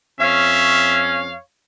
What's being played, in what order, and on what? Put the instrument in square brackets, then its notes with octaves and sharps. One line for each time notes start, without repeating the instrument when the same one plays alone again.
[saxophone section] F2 C#5 F5 [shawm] C#4 [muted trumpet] E5